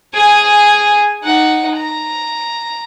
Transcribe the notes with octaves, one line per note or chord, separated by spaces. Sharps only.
G#4 G#5
D#4 F#5
A#5